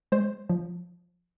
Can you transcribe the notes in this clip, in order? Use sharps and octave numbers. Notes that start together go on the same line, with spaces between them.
G#3 C5
F3